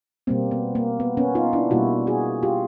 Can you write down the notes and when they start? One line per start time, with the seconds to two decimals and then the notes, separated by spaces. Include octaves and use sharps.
0.27 B2 G3 A#3 C4
0.51 B3
0.75 A#3
1.00 B3
1.17 B3 C#4
1.35 D#4 F4
1.53 D4 E4
1.71 B2 G3 A#3 E4 F#4
2.07 F#4 G#4
2.43 F4 G4